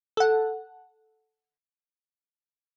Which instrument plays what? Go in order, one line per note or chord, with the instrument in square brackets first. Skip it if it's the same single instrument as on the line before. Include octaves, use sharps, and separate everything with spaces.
[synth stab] A4 F#5